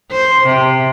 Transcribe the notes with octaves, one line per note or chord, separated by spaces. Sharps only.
C5
C3